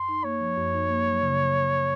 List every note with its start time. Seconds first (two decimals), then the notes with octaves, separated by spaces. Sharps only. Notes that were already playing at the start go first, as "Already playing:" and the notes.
Already playing: F#2 C6
0.09 D#4
0.24 A#3 C#5
0.40 F3
0.57 F#2
0.74 D#4
0.89 A#3
1.07 F#3
1.22 C#3